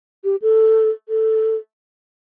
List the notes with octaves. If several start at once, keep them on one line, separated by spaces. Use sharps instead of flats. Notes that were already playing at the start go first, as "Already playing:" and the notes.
G4
A4
A4